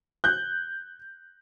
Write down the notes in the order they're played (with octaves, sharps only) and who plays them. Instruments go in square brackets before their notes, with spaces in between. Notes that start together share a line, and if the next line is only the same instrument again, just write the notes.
[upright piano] F#6 G6